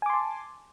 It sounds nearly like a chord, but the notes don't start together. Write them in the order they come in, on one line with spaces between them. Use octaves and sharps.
G#5 D6 C6 A5